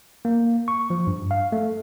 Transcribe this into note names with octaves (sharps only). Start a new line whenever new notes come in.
A#3
C#6
F3
G2
F5
A3